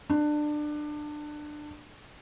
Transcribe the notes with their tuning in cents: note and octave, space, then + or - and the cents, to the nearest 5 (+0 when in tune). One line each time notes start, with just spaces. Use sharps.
D4 +25